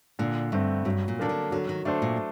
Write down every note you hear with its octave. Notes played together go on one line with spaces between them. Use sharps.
A#2 D3
G2 A3 C4
G2 F#3
A#2
D#3 A#3 D4 A4
D3
D3 F#3
D#3
D3 A3 D4 A4 C5
A#2